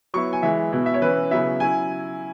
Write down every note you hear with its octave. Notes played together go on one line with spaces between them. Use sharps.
F#3 B3 E4 C#6
G#5
E3 G#3 E4 E5
B2 B3 E4
E5
C#5
E3 C#4 E4 B4
C#3 F#3 B3 E4 E5
F#3 C#4 E4 G#5